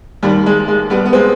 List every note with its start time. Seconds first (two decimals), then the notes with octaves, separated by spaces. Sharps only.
0.23 D#2 D#3 G3
0.46 G#3
0.68 G#3
0.90 G3 B3
1.06 B3
1.13 G#3 C4